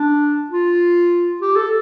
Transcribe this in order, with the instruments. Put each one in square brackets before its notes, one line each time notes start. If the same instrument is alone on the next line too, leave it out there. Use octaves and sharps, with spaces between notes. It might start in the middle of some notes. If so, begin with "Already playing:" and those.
Already playing: [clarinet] D4
F4
G4
A4